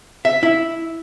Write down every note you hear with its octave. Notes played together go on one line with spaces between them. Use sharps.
E5
E4